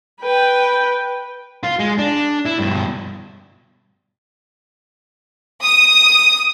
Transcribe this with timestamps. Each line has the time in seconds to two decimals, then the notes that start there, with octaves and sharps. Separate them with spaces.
0.22 B4 G5
1.63 F4
1.79 G#3 G#4
1.98 D4
2.45 E4
2.59 G2 B2
5.63 D#6